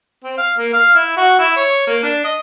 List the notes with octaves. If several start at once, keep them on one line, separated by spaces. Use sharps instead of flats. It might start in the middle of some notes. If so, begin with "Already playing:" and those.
C4
F5
A#3
F5
E4
F#4
E4
C#5
A#3
D4
D#5